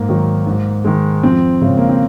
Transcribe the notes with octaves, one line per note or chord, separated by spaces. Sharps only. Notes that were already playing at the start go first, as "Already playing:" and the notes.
Already playing: G#2 A#3
D#3 F#3
G#2
D#3 G#3
F2 C4
C#3 G#3
A#3
C4